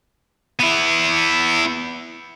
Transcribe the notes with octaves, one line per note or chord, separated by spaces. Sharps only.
B3 E4